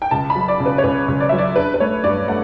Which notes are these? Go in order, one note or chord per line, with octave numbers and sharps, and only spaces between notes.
G5
C#2 A5
B5
F#3
D5
C#3
B4
C#5
C#2 B4
C#2
D5
F#3 E5
D5
D4 B4
B4
A3 C#5
G2 D5
A3 F#5